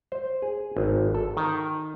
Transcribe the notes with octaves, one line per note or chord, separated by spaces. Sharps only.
C5
G#4
G#1
A4
D#3